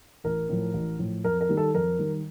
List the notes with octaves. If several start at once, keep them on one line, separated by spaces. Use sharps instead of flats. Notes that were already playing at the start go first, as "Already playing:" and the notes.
A1 A#4
A2 F3
A1
A2 F3
F2 A#4
A#4
D#3 G3
A4
F2 A#4
D#3 G3